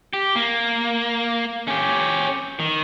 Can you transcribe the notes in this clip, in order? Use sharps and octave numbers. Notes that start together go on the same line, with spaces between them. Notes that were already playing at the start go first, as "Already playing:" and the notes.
G4
A#3
C#4 G4
D#3